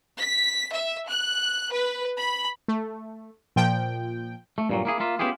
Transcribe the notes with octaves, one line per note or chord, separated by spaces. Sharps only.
B6
E5
F#6
B4
B5
A3
A#2 F3 G5
A3
G2 A#2 F#3
A#3 E4 G#4
A#3 F4 E5
B3 C#4 E4 F4 G4 G#4